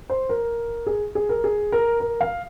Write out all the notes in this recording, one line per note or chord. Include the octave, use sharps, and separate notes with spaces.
C5
A#4
G#4
G#4
A#4
G#4
A#4
A#4
F5